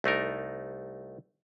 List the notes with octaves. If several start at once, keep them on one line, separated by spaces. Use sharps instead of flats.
C2 A3 D#4 A#4